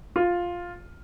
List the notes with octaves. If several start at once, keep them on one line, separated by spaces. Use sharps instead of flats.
F4